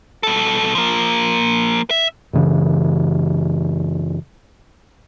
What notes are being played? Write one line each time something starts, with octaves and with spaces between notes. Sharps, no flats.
B2 A4
F3 A#3
E5
F#2 C#3 E3